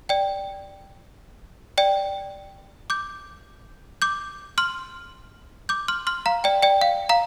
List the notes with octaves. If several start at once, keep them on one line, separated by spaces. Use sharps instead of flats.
D5 G5
D5 G5
D6 G6
D6 G6
C6 F6
D6 G6
C6 F6
C6 F6
F5 A#5
D5 G5
D5 G5
F5
F5 A#5